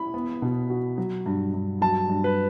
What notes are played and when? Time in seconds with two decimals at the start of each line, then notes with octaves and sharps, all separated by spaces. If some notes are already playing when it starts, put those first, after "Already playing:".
Already playing: E4 B5
0.14 B3
0.42 B2
0.70 F#4
0.98 F#3
1.26 G2
1.54 G2
1.82 F#3 A5
2.09 G2
2.24 B4